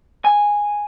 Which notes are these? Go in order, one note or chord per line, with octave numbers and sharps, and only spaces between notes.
G#5